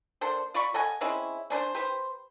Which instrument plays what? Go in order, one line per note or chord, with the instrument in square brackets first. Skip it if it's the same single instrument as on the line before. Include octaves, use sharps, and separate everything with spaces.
[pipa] A#3 D4 A4 C5
F4 D5 B5 C#6
A4 D#5 F#5 G#5
G#3 C4 C#4 E4
C#4 D4 B4 C5
G4 B4 C5